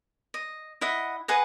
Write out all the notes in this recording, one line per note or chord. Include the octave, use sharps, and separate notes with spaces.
D#5
E4 D#5 F#5
G#4 B4 D#5 F#5